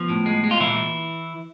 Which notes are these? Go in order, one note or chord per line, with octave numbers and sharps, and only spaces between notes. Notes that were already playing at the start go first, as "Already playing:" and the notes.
Already playing: F3 B3
A2
G#3
G#3
F4
A#2 E3 E4